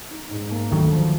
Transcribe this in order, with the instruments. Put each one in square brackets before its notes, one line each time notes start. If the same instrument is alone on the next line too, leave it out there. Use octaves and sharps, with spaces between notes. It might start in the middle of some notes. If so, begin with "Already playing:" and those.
[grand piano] D#4
G#2
A#3
[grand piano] D2 [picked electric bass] D#3 F#3
[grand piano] F3